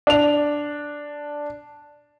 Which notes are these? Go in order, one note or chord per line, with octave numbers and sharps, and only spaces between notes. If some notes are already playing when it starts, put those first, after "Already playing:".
D4 F7